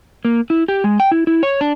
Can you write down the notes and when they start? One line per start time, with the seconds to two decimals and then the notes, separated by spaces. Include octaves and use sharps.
0.25 A#3
0.50 E4
0.68 G4
0.84 G#3
1.00 G5
1.12 E4
1.27 E4
1.43 C#5
1.61 D4